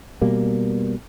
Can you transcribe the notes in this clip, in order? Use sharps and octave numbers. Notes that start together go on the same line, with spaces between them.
B2 G3 A#3